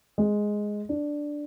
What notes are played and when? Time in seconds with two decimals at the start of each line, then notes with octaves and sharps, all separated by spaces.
0.18 G#3
0.89 D4